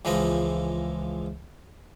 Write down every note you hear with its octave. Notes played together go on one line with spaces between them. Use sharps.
C#2 E3 F3 G#3 D#5